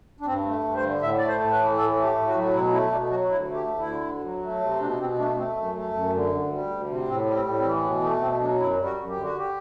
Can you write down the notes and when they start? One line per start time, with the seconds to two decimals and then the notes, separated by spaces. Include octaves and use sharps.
0.20 D4
0.26 G2 C4
0.45 A3
0.64 G2
0.76 C5
0.82 D3
1.01 A2 E5
1.18 A3 D5
1.28 C5
1.40 A2
1.52 B4
1.58 E3
1.77 A2 A4
1.96 A3
2.03 G4
2.16 A2
2.28 F#4
2.35 F#3
2.53 B2 E4
2.72 A3 E4
2.91 B2 D4
3.10 F#3 F#4
3.29 D2 E4
3.48 A3
3.54 G4
3.67 D2
3.79 E4
3.86 D3
4.05 D2
4.24 F#3
4.42 A3
4.61 C3
4.80 B2 D4
4.99 B2 C4
5.18 A3 D4
5.37 A3 C4
5.56 F#2
5.75 A3
5.94 F#2
6.13 D3
6.31 D2
6.51 G3
6.69 D2
6.89 C3
7.08 A2 C4
7.26 G3
7.33 C4
7.46 A2
7.58 C4
7.64 E3
7.83 B2 B3
8.02 A3 B3
8.21 B2 C4
8.40 F#3 D4
8.58 F#2 E4
8.78 G3
8.85 F#4
8.97 F#2
9.09 G4
9.16 D3
9.23 F#4
9.38 G4